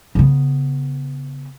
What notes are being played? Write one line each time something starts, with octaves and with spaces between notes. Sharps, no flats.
C#3 B3